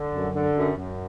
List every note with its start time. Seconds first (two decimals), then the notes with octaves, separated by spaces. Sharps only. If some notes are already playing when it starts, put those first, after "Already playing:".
Already playing: D3
0.13 F#2
0.35 D3
0.56 F#2
0.77 F#2